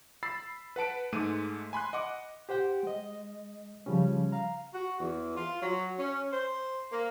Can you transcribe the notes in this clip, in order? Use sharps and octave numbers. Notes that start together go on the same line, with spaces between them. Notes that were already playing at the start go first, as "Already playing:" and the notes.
B5 E6 A6 C7
B4 F#5 A5 D7
G#2 G#3 A3 D6 D#7
G#5 B5 C6 F#6
D#5 F#5 D6
G4 C5 F#5 G5
G#3 D#5
C#3 F3 G3 C#4
F5 A#5
F#4
E2
F4
F#3
C#4
C5
A#3